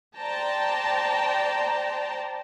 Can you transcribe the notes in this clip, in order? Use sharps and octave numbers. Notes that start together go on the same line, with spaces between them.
C5 D5 G5 A5 A#5